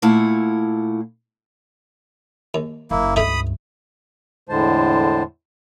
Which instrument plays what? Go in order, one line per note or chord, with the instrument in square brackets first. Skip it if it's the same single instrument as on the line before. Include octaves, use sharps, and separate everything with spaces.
[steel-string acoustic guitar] A#2 A3 E4 F5 F#5
[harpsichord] D#2
[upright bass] F#1 [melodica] A#3 E4
[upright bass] C#2 G2 [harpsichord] A3 D#4 E4 [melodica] B5 D#6
[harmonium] E2 A2 D3 G#3 C5 A5